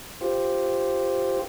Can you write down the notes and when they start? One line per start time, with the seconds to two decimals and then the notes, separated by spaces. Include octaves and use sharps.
0.21 F4 G4 C5